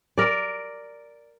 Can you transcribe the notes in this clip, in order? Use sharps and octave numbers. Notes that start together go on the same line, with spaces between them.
A#4 D5